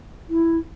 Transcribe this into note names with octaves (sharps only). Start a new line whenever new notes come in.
E4